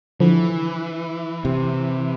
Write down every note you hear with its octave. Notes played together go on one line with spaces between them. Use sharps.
D3 E3 F3
C3